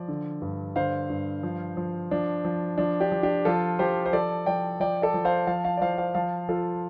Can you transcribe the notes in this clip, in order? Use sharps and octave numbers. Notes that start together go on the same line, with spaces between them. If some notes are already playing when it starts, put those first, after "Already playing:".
Already playing: F3 D5
D3
G2
D3 C5 F5
G2
F3
F3
F3 D4
F3
F3 D4
D4 G4
F3
D4 G4
F3 F4 A4
F3 G4 C5
C5
F3 A4 D5
F3 D5 G5
F3 D5 G5
A4 D5
F3
C5 F5
F3 F5 A5
F5 A5
D5
F3 C5 F5
C5 F5
F3 F5 A5
F3 F4 A4